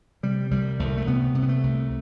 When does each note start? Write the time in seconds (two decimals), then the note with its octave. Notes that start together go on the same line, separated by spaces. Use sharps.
0.23 C3 G3
0.51 C2 G3
0.79 C2 A3
0.97 A3
1.07 C3 B3
1.35 C3
1.43 B3
1.49 A3
1.63 C2